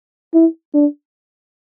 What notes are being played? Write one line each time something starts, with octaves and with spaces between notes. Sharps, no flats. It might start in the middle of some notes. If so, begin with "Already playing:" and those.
E4
D4